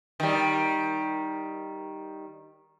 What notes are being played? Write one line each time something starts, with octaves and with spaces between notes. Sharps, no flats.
D#3 G3